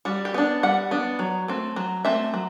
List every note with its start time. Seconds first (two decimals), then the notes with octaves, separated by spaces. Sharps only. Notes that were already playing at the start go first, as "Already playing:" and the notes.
0.05 G3 F#4
0.25 G4
0.34 B3 D4
0.63 G3 F#5
0.91 B3 D4
1.19 F#3
1.48 A3 C4
1.76 F#3
2.05 A3 C4 E5
2.34 F#3